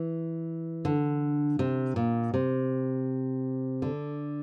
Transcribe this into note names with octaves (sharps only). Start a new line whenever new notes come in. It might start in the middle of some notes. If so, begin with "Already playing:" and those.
Already playing: E3
D3
C3
A#2
C3
D3